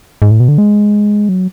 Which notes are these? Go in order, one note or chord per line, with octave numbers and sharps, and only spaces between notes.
G#2
A2
B2
D3
G#3
F#3